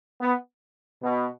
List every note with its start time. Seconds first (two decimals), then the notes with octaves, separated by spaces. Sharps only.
0.21 B3
1.02 B2